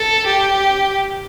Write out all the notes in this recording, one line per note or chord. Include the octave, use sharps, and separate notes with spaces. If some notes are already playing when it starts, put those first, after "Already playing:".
Already playing: A4
G4